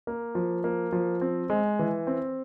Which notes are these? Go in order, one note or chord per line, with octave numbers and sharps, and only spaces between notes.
A#3
F3
A#3
F3
C4
G#3
E3
C4